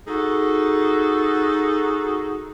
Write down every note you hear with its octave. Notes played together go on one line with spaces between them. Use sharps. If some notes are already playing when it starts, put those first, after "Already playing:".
D#4 F#4 G#4 A4